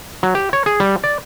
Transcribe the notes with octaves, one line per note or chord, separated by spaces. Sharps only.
F#3
G4
C#5
G#4
G3
D5